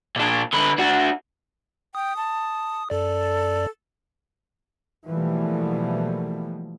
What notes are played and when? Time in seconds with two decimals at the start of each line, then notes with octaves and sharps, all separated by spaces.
0.16 A#2 D4
0.53 D3 B4
0.78 D4 F#4
1.95 G5 D#6
2.16 A5
2.90 F#2 A4 D5
5.09 B2 E3 F3 G3 A3 A#3